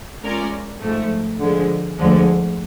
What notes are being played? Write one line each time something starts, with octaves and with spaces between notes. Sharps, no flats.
G#3 C#4 F4 A#4 D5
G#2 F3 A3
D3 F3 G#3
D2 D3 F3 G#3